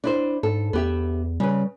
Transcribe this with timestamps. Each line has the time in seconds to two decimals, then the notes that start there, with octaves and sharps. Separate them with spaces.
0.04 D4 E4 C5
0.43 G#2 A4
0.73 E2 B3 G4 E5
1.40 C#3 G3 B4